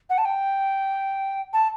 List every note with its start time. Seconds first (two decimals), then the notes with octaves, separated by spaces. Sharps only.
0.10 F#5
0.18 A5
0.25 G5
1.53 A5